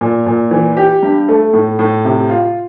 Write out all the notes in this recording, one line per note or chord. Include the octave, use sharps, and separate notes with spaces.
A#2
A#2
E3
G4
G2
A3
A2
A2
C3
F4